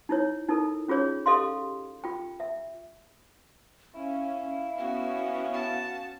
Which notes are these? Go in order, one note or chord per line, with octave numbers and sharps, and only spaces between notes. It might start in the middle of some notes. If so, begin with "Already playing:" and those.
D#4 E4 C#5
D#4 E4 A4 A#4
C#4 F4 G#4 C#5 D5
G4 A4 D#5 F5 C6
F4 G5
E5
C#4 E4 F5
B3 C#4 F#4
F#4 A5